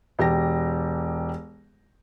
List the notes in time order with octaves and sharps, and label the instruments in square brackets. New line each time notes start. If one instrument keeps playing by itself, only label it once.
[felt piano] E1 G4 A5 A#6